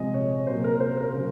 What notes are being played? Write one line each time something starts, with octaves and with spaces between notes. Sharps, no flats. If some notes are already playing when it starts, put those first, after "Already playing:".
Already playing: C3 F3 G#3 D#5
C#5
C3 F#3 A#3 C5
A#4
C5
A#4
C#3 F#3